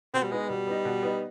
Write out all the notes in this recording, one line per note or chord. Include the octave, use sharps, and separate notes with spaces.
B2 C4
G3
G#3 B3 D#4
B2 G3
B3 D#4
B2
B3 D#4